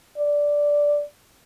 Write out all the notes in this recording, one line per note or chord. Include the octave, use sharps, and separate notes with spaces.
D5